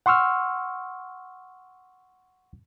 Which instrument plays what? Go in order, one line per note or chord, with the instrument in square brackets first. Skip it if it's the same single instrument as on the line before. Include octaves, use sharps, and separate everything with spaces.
[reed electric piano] F#5 C6 C#6 E6 F6